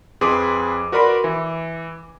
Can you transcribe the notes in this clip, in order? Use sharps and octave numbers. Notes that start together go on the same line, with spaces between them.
F2 G#4 B4 G#5 C6 D6
F#4 A#4 B4 D5 B5 C6
E3